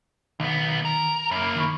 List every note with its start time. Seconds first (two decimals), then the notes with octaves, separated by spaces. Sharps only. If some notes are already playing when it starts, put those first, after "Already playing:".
0.40 B1 D#3 B3
0.85 A#4
1.31 F#2 A#3 B5
1.56 D#3 B5 C#6